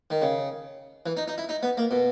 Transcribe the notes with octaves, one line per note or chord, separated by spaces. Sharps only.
D#3
C#3
E3
D#4
D#4
E4
D#4
B3
A#3
B2